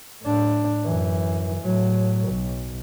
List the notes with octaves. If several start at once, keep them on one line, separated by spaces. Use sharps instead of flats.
A2 D4
F#2 E3
A2 F#3
B1